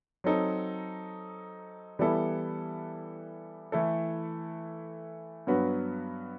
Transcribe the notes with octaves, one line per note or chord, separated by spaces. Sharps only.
F#3 C4 D#4 A4
E3 G3 B3 E4 A4
E3 A3 E4 A4
G2 F#3 B3 F#4 B4